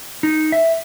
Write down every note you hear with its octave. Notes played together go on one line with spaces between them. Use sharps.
D#4
E5